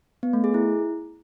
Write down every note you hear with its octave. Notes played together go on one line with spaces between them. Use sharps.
B3
A3
G#4
E4